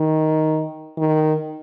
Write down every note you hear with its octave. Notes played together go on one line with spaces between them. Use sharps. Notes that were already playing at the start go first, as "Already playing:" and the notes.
Already playing: D#3
D#3